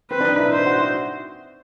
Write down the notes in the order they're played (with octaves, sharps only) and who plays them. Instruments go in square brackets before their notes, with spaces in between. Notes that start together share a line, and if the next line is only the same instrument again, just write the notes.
[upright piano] C4 [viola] B4
[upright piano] D4
D#4
E4
[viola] C5
[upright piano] F#4
E4